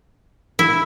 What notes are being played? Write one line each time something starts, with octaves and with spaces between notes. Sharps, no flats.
E4